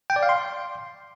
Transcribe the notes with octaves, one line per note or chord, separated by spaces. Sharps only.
G5
D5
F5
C6